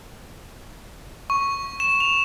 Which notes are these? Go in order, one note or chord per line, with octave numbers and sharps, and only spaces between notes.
C#6
E7
F7